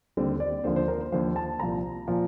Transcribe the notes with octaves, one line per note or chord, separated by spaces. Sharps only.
D#2 D3 G3 C4
D5
D#2 D3 F3 C5
C5
A#4
C5
D#2 D3 F3 C5
A5
C2 A#2 F3 A#5
A#2 F3